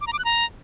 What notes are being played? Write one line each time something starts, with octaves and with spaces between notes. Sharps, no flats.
D6
A#5
D6
F#6
A#5